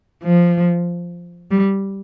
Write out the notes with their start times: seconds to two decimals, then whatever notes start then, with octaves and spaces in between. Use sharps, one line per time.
0.24 F3
1.51 G3